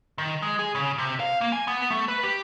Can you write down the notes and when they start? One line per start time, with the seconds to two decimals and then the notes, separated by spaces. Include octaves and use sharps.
0.18 D#3
0.42 G#3
0.59 G#4
0.75 C#3
0.98 C3
1.20 F5
1.41 A#3
1.52 G#5
1.68 B3
1.91 A3
2.08 B4
2.23 G4